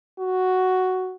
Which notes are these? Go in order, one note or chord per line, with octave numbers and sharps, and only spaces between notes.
F#4